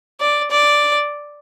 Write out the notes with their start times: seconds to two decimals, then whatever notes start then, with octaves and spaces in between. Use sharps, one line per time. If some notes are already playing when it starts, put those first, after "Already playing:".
0.21 D5
0.51 D5